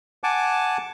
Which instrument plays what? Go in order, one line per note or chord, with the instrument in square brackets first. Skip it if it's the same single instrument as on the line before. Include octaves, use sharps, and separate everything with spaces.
[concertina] F#5 G#5 A5 D6